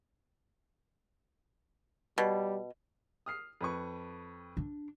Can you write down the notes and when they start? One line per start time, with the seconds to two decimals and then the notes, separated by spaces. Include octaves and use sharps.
2.18 B2 G3
3.26 D#6 F6 C7
3.61 F2 B4 C#6
4.57 D4